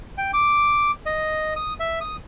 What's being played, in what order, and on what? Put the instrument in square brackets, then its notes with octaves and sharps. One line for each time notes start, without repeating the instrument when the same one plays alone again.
[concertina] G5
D6
D#5
D#6
E5
D#6